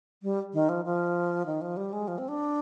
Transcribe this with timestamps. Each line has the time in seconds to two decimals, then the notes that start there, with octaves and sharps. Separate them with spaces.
0.23 G3
0.54 D#3
0.69 F3
0.85 F3
1.46 D#3
1.61 F3
1.77 G3
1.93 G#3
2.08 F3
2.18 C4
2.28 D4